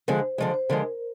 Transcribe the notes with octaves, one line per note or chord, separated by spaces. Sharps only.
D3 F3 G#3 C5
D3 F3 G#3 C5
C5
D3 F3 G#3 A#4